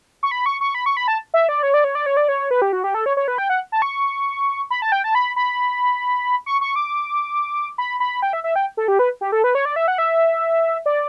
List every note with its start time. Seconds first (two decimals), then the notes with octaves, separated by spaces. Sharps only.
0.23 C#6
0.31 B5
0.46 C#6
0.61 C#6
0.75 B5
0.86 C#6
0.97 B5
1.08 A5
1.34 E5
1.49 D5
1.63 C#5
1.74 D5
1.84 C#5
1.95 D5
2.06 C#5
2.17 D5
2.28 C#5
2.51 B4
2.62 G4
2.73 F#4
2.84 G4
2.94 A4
3.06 C#5
3.17 C#5
3.28 B4
3.38 G5
3.50 F#5
3.72 A5
3.82 C#6
4.70 B5
4.82 A5
4.92 G5
5.04 A5
5.15 B5
5.36 B5
6.46 C#6
6.61 C#6
6.76 D6
7.78 B5
8.00 B5
8.22 G5
8.33 E5
8.44 E5
8.56 G5
8.77 A4
8.88 G4
8.99 B4
9.21 G4
9.32 A4
9.44 B4
9.55 C#5
9.65 D5
9.76 E5
9.88 F#5
9.98 E5
10.86 D5